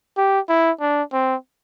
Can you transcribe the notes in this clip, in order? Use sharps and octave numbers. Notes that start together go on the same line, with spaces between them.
G4
E4
D4
C4